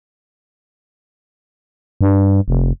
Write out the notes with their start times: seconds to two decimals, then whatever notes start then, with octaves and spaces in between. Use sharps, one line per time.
2.01 G2
2.48 F1